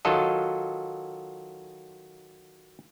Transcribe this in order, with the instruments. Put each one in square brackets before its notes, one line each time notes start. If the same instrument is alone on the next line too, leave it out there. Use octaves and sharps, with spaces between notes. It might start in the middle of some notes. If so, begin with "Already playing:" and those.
[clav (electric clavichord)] D#3 F#3 F4 A4 D#5